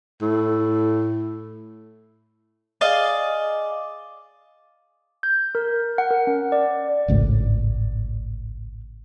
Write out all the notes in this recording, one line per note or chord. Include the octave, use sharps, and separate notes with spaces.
A2
G#4 D5 D#5 F5
G6
A#4
F#5
A#4
C#4
D5
G#1 C#2 A2